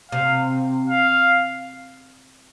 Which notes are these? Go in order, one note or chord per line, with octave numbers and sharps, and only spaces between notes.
C3 F5
F5